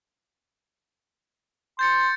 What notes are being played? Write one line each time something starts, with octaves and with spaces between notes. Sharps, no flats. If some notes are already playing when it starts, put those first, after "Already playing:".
C6 G6 A6 C#7